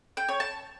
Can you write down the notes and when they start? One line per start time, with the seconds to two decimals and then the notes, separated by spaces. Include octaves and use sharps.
0.17 G5
0.29 C#5
0.40 A5